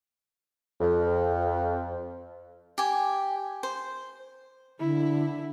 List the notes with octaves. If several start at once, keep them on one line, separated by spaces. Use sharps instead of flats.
F2
G4 G#5
C5
D3 E4